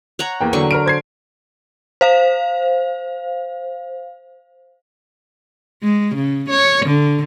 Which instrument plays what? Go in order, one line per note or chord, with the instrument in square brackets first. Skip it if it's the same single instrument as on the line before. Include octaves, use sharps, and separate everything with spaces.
[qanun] C#5 F#5 A#5
[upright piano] E2 A#3 G5
[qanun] D3 F#3 C#6
[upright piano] A#4 F6 D7
C5 G#6 C7
[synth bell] C5 F5
[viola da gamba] G#3
C#3
C#5
D3